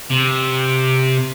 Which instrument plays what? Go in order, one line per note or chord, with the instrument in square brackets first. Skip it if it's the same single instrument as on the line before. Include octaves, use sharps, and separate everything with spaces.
[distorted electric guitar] C3